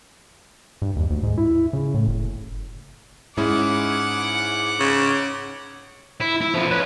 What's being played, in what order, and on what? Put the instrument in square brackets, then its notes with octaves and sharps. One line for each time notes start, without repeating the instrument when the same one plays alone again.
[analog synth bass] G2
D#2
D2
G#2
E4
C#3
A2
F#1
[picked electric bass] G#2 [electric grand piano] C#4 E4 G#4 [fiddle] F#5 D6
[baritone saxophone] C#3
[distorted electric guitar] E4
E4
F3 B3
C#4 B4